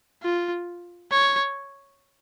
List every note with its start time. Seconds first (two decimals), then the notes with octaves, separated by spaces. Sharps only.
0.23 F4
1.12 C#5